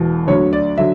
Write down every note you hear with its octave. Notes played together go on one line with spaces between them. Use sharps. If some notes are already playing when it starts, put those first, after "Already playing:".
Already playing: E1 E2 B2
D2 D3 F#3 C#5
D5
D3 F#3 E5